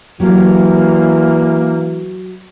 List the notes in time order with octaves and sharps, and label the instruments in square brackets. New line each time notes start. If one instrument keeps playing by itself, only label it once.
[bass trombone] E3 [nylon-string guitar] F#3 G4 [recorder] A#3